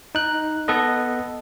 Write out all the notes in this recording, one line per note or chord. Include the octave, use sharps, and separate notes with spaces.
D#4 F#6
B3 A4 B4 D#5